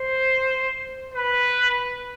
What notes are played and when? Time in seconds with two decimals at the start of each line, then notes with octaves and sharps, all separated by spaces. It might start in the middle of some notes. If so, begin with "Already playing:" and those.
Already playing: C5
1.15 B4